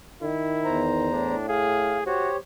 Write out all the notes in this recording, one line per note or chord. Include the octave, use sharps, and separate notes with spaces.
D#3 E4
E2 C5 A#5
A2 D4
G#4 F5
F#4 G4 C5 C#5